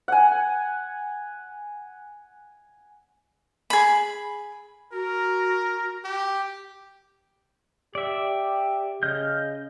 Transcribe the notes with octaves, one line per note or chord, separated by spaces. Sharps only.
F#5 G#5
G#4 B5
F#4 A#4
G4
G4 D5 E5
C#3 D#5 F6 G6